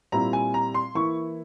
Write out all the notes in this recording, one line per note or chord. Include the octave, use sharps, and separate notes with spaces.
A#2 G3 C4 E4 A#5
G#5
A#5
C6
E3 A#3 E4 C#6